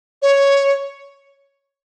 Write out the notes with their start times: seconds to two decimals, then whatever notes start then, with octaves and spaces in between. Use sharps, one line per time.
0.22 C#5